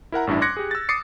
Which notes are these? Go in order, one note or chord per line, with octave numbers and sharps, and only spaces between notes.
E4 A#4 F#5 A#5
A1 G2 D4 E4
C6 D6 F#6 G#6 A#6 C#7
G4 G#4
E6 A6
D6 D#6 A6 C7 C#7